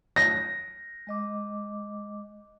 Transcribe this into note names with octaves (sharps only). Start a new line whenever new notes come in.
A#6
G#3 D#5 D6